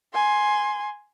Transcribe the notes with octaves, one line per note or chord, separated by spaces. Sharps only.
G#5 C6